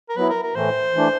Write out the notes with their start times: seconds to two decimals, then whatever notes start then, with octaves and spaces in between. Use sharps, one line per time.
0.09 A#4
0.17 F#3 B3 E4 B4
0.30 A#4
0.43 A#4
0.56 A2 E3 A3 C5
0.94 E3 A3 D4